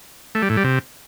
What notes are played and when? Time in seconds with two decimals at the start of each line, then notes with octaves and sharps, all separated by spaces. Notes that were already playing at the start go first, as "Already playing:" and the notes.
0.35 A3
0.42 G3
0.50 A2
0.57 G3
0.64 C3